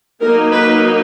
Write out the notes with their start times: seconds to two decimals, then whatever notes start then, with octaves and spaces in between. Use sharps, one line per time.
0.22 F#3 A#3 D#4 A#4
0.51 B4